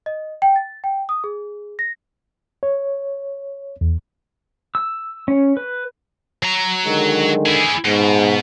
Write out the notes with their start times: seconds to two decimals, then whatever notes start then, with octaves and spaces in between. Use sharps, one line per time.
0.06 D#5
0.42 G5
0.56 A6
0.84 G5
1.09 D#6
1.24 G#4
1.79 A#6
2.63 C#5
3.81 E2
4.75 E6
5.28 C#4
5.57 B4
6.43 F#3 A#5
6.85 D3 D#3 G#3
7.46 E4 G#4
7.85 G#2 B2